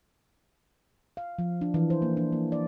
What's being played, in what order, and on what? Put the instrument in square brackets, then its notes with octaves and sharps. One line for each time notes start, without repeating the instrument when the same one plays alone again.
[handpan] F5
F3
D4
E3
C5
A#3
D4
A#3
D5